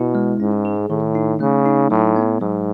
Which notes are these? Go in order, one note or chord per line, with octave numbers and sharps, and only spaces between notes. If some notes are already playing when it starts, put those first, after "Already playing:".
Already playing: B2 E4
G#3
G#2 C#4
G#4
A2 D#3
D#4
C#3 A3
D#4
A2 F#3
B3
G#2 F#3